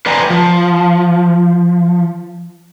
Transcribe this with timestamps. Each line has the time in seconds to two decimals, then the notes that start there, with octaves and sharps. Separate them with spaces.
0.06 B4 C5 D5 G5 G#5 A#5
0.30 F3